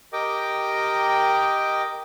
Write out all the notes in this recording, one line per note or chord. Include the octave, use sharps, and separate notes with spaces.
G4 A#4 D#5 G5 D6